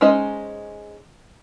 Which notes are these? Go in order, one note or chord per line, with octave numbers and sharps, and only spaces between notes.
G#3 C#4 D#4 C5 D#5